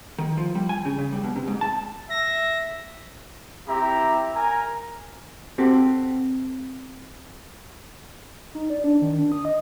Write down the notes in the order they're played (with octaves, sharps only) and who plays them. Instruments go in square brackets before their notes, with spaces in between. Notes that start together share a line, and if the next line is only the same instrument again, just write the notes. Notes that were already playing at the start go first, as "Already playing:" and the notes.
[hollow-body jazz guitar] D#3
F3
G3
G#5
C#3
C#3
G3
B2
C3
G#2
A5
[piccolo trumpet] E5 [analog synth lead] A#6
[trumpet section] C4 E4 G4 E5 A#5
A#4 G#5 A#5
[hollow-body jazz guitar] C4 F#4 G4 A4
[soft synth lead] D#4
D5
D4
D#3
D4
D#6
D#5